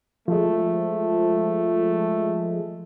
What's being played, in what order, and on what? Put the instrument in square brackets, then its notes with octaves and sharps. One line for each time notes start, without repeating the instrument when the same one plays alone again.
[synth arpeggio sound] F3 G#3 [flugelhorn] A3